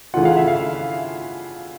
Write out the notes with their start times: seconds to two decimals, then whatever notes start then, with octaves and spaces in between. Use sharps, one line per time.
0.14 C#3 E3 A3 D4 F4 F#5
0.25 F5
0.37 E5
0.48 F5